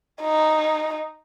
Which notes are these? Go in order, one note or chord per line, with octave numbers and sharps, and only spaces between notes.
D#4